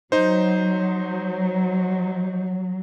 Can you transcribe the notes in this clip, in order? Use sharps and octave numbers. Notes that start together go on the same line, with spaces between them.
F#3 D#4 C5